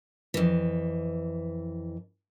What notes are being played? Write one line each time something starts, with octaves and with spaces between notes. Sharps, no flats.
F2 E3